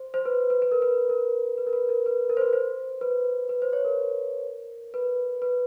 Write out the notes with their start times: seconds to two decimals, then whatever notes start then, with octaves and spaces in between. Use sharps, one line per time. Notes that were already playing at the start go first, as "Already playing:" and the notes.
Already playing: C5
0.14 C5
0.26 B4
0.50 B4
0.62 B4
0.72 A#4
0.82 B4
1.10 A#4
1.58 B4
1.67 A#4
1.73 B4
1.89 A#4
2.06 B4
2.29 A#4
2.37 C5
2.41 B4
2.53 C5
3.01 B4
3.49 B4
3.62 C5
3.73 C#5
3.85 A#4
4.94 B4
5.42 B4